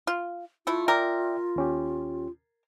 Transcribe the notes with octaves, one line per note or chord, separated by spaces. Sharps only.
F4
A3 E4 F4
A#4 D5 E5 G5
D#2 C#4 G4